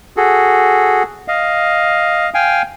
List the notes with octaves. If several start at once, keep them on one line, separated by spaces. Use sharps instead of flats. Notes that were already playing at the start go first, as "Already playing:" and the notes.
F#4 G#4 A4
D#5 F5
F5 G5 G#5